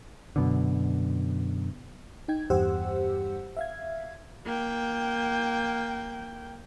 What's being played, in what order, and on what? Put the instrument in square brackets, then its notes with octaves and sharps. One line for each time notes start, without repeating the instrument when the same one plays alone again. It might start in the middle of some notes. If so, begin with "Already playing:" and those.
[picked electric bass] F#2 B2 D3
[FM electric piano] D#4 G5 G#6
E2 G2 G4 C5 F#5 E6
E5 F5 G#6
[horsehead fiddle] A#3 G5